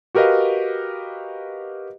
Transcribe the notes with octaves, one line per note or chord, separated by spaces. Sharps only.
F#4 G4 A#4 B4 D#5 F5